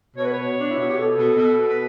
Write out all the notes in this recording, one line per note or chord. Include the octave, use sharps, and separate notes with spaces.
B2 C#5
B4
B2 C#5
B2 D4
E4
B2 F#4
G4
B2 A4
B2
B2
B2
B4